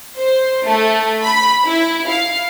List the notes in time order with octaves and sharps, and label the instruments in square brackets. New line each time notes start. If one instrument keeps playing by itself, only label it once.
[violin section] C5
A3
B5
E4
F5